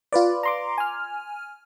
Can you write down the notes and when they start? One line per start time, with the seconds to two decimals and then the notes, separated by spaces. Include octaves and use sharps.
0.13 F4 B4 D5
0.43 A#5 C6 D6
0.78 G#5 F6